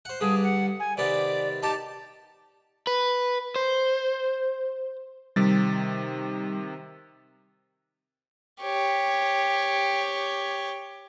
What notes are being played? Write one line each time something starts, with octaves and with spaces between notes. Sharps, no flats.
C5 F#5
G2 D3 G#4
F#5
G#5
C3 D#3 B3 D5
D#4 G4 A5
B4
C5
C3 D#3 G3 A6
G4 C#5